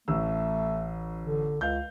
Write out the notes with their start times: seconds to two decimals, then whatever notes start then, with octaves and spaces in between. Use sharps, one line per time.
0.08 A1 A3 E6
1.22 D3
1.61 C#2 F5 G6